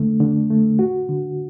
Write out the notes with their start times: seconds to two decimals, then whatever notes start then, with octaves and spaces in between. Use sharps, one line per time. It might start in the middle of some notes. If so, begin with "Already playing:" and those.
Already playing: D3 A3
0.20 D3
0.50 A3
0.79 F#4
1.09 D3